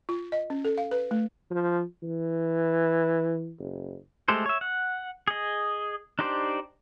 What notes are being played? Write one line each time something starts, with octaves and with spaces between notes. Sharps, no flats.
F4
D#5
C#4
A4
F5
B4
A3
F3
E3
F#1
G#3 A3 G4 A4 C5
C#5 E5
F#5
G#4 D#5
D4 D#4 G4 C5 D5